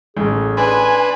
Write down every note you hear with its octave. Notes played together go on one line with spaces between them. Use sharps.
A1 G#4
D4 B4 G#5 C6